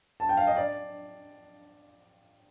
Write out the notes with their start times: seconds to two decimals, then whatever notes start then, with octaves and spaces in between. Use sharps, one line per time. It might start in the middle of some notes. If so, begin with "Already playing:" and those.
0.20 A5
0.29 G5
0.37 F5
0.47 D#5
0.56 D5